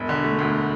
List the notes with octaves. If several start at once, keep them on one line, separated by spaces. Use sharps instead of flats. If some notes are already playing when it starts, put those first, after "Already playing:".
Already playing: E1
D3
A3
D2